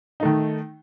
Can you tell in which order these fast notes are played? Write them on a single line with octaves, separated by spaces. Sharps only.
D#4 A3 D#3